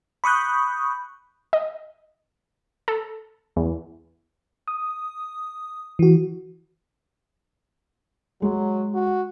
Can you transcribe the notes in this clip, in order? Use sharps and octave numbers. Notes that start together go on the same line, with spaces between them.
B5 C#6 D#6 F#6 G6
D#5
A4
E2
D#6
E3 F#4
F#3 G#3
F#4